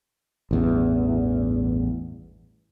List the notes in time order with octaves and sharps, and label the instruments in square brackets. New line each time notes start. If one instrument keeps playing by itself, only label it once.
[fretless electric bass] A1 E2 G2